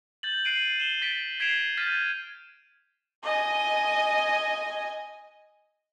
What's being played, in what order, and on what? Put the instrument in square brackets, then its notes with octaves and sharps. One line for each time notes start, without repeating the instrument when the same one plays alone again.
[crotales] G6 A6 F#7
F#6 C7 D7 D#7 F#7
E7 G7
A6 B6 D7
G#6 B6 C7 D7 E7 F7
F6 G6 A6 B6 D#7
[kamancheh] D#5 G#5